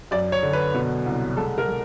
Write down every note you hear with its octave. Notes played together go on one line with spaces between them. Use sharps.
F#2 D5
C#5
D3
B4
B2
C2
G#3 A4
A#4
G#3